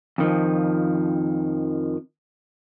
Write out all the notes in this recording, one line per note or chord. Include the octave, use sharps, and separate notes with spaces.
F2 D#3 F3